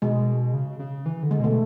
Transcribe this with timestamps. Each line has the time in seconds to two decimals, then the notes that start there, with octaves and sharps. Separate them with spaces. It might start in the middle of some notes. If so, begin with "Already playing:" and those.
0.02 B2 G#3
0.54 C#3
0.79 C#3
1.06 E3
1.23 D3
1.31 G#3
1.40 B2 A3